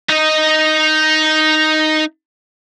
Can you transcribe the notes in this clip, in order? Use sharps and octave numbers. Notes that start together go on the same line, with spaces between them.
D#4 D#5